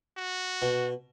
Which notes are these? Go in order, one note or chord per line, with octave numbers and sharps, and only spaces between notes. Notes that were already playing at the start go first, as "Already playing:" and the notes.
F#4
B2